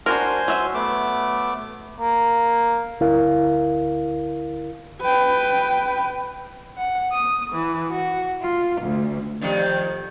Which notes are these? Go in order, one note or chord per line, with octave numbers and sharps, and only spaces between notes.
D4 F#4 A#4 C5 G#5 C6
F#3 E5
A3 B3 D6
A#3
D2 E4 A#4 F5
B4 G5
F#5
D#6
E3
F#4
F4
D2
F2 D#3 G3